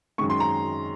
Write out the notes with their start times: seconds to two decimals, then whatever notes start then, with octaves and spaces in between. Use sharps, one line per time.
0.18 F#2 D#3 G#3 C#6
0.30 C6
0.40 A#5